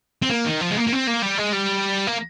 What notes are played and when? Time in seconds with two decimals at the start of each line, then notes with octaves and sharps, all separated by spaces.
0.22 C4
0.30 A#3
0.45 D#3
0.61 F3
0.70 G#3
0.77 A#3
0.87 A#3
0.92 C4
1.07 A#3
1.23 G3
1.39 G#3
1.53 G3
2.07 A#3